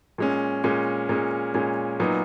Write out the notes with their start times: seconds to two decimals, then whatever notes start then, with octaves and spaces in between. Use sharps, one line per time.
0.18 A#2 G#3 C#4
0.64 A#2 G#3 C#4
1.09 A#2 G#3 C#4
1.54 A#2 G#3 C#4
2.00 A#2 F#3 B3 D#4